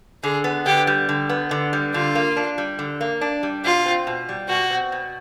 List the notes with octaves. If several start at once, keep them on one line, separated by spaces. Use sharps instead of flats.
D3 G#4
B3
D3 G4
G3
D3
B3
D3
G3
D3 F4
A#3
D4
G3
D3
A#3
D4
G3
B2 F4
C4
B2
G3
B2 F#4
C4
B2